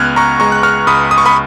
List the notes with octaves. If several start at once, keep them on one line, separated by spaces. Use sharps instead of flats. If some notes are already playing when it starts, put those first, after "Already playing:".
Already playing: C#2 B3 F6 F#6 G#6
A#5 C#6
G#3 A#5 C#6
F#6
C#6 F6
C#2 B5 D#6
D#6
C#6
B5 D#6